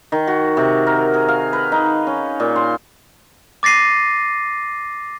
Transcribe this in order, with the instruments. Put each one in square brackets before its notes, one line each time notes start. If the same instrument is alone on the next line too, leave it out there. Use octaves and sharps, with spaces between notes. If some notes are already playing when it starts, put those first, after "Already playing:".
[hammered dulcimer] D#3
F#4
C3
A#4
G#4
F5
B4
D#4
C#4
A#2
C6
[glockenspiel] D6 A6 A#6 C7 D#7